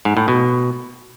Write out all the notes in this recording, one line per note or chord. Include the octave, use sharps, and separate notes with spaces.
G#2
A2
B2